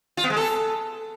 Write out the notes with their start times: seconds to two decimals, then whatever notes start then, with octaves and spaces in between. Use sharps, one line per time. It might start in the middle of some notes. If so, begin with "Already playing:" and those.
0.17 F4
0.24 B3
0.30 G#3
0.36 A4